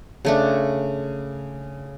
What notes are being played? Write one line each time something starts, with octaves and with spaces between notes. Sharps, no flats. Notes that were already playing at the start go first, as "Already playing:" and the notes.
C#3 A3 D4